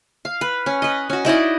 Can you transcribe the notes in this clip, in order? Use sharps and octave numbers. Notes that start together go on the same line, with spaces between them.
F5
B4
C#4
B4 D#5
C#4 F#4
D#4 E4 D5 D#5